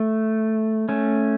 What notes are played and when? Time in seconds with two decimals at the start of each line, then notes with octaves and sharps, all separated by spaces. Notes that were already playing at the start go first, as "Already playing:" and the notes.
Already playing: A3
0.89 A3 C#4